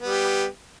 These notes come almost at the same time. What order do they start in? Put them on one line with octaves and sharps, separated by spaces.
B3 G3 G4